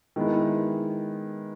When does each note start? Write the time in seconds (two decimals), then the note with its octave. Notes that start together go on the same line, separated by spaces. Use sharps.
0.16 D#3 G#3 B3 E4